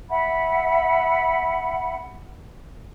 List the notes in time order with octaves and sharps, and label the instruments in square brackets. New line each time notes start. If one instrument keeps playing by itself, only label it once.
[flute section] E5 F#5 B5